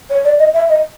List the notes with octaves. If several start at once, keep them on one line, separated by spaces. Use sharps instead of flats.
C#5
D5
D#5
E5
D#5